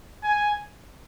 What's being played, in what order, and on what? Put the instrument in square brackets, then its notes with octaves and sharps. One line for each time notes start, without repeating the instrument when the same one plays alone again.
[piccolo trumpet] G#5